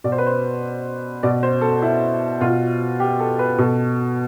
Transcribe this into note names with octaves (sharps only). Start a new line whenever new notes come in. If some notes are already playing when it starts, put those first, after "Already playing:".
B2 D5
C5
B4
C5
B2 D5
C5
A4
E4
B2 F4
G4
A4
B4
B2 A4